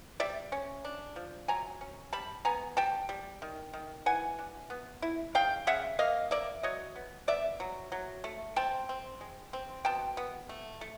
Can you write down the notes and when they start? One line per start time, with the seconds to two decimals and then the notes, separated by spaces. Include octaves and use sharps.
0.20 G3 D5 E5
0.52 C#4
0.84 D4
1.16 F3
1.48 F#3 G#5 A#5
1.81 C#4
2.13 G3 A5 B5
2.45 B3 G#5 A#5
2.77 G3 G5 A5
3.09 G3
3.42 D#3
3.74 D#3
4.06 E3 F#5 G#5
4.39 D4
4.70 B3
5.02 E4
5.35 C#3 F5 G5
5.67 C#3 E5 F#5
5.99 A#3 D#5 F5
6.31 A#3 D5 E5
6.63 F#3 C#5 D#5
6.96 B3
7.27 B3 D5 E5
7.60 F#3
7.92 F#3
8.24 A3
8.56 C4 G5 A5
8.89 C4
9.21 G#3
9.53 C4
9.85 B2 G5 A5
10.17 B3
10.49 A3
10.81 A3